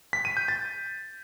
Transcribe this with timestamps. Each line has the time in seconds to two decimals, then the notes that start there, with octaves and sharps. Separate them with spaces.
0.13 B6
0.25 D#7
0.37 G6
0.48 A6